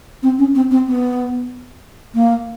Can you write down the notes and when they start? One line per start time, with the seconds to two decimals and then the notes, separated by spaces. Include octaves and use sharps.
0.23 C4
0.39 C#4
0.55 C4
0.71 C4
0.87 B3
2.15 A#3